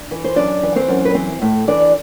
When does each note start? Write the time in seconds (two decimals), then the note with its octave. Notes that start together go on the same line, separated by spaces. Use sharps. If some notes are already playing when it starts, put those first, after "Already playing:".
Already playing: D4
0.11 E3
0.24 C5
0.36 F#2 D4 D5
0.63 E3
0.76 C4 C5
0.88 F#2
1.05 B4
1.15 E3 C4 C5
1.42 A2
1.68 E3 D4 D5